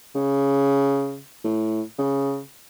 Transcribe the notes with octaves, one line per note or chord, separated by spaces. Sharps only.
C#3
A2
C#3